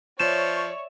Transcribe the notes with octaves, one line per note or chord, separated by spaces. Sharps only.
F3 C#5 D5 E5 E7